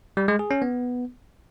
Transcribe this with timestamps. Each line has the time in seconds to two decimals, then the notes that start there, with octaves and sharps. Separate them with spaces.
0.17 G3
0.28 G#3
0.39 G#4
0.51 C#4
0.62 B3